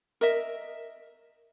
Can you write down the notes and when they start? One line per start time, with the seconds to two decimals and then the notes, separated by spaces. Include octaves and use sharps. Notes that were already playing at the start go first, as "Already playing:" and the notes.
0.21 A#4 D#5 E5